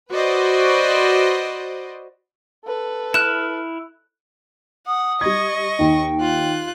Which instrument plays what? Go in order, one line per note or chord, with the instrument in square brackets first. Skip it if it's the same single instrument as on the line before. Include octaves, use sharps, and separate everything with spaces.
[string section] F#4 B4 C5 D5 D#5
[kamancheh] A4 B4
[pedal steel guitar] E4 F6 [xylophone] F#6 E7
[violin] F#5 [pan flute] D#6
[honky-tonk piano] G3 G#6 [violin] D#5 C#6
[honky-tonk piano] D#2 D#4 [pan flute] G5
[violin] F4 F#6